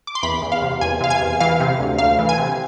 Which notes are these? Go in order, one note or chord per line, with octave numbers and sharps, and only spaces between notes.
D6
C6
E2 B5
E2
F5
C3
E2 G#5
C3 F5
G#5
E2
E3 F5
C3
D2
D2 F5
E3
G#5
C3